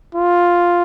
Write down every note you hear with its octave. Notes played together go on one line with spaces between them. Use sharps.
F4